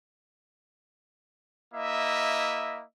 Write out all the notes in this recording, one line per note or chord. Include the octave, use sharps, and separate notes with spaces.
A#3 E4 D#5 E5